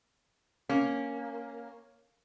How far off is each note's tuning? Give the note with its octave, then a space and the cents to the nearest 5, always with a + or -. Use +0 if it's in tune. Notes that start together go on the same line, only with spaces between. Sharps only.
A#3 +0 C#4 +0